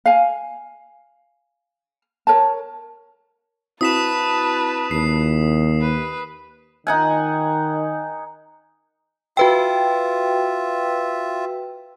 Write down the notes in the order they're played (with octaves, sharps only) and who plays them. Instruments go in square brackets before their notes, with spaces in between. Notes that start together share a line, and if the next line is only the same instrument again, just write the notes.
[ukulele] F5 G#5
A#4 C#5 A5
[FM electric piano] C4 E4 F#4 [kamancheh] B4 A5 [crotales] D#6 B6 E7
[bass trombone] D#2 [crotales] C7
[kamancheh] B4
[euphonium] D#3 [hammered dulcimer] D#4 F#5 G#5
[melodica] F4 E5 [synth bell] F#4 B4 G5